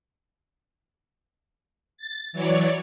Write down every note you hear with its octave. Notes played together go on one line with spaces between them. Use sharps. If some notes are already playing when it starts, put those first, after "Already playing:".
A6
E3 F#3 C#5 D5